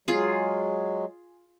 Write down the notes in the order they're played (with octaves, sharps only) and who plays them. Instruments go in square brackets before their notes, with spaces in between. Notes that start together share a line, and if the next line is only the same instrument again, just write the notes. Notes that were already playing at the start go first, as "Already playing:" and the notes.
[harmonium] F#3 G#3 [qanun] F4 G#4